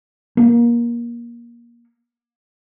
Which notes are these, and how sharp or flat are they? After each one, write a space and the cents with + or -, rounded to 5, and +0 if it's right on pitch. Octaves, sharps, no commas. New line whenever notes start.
A#3 +25